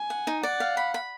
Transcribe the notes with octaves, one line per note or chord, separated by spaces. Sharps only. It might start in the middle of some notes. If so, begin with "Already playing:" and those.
Already playing: G#5
F#5
D#4
D5 F#5
F5
B5
B5